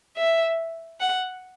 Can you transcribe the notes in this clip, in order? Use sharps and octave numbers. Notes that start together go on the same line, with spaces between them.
E5
F#5